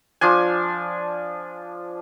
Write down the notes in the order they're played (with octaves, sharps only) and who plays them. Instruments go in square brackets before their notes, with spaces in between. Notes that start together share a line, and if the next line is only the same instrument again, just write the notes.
[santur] F3 D4 G#5